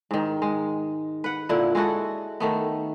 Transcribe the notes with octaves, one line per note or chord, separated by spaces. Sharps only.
G#2 D#3
G#3
B4 F#5
A#2 D3 E4
G#3 E4 F#4 A4
D#3 A3 B3